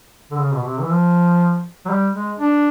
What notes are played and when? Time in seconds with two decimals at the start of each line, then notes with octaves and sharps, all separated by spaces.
0.31 D3
0.39 C#3
0.55 B2
0.64 C3
0.80 E3
0.90 F3
1.85 F#3
1.90 G3
2.14 G#3
2.39 D4